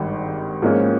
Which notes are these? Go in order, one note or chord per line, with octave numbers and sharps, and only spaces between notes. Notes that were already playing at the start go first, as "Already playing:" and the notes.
Already playing: G#1 G2 D#3
G#2 F3 A#3 C#4